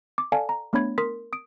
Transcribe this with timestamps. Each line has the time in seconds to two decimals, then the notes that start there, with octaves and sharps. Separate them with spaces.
0.18 D6
0.32 A4 D5 F5 G#5 A5
0.49 A#5
0.73 A3 B3 D4 C#5 B5 G#6
0.98 A#4 C6 D#6 B6
1.33 D#6 D7